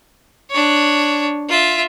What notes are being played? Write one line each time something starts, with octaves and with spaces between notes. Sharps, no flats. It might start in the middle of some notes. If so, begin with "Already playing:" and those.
D4 C#5
F4 E5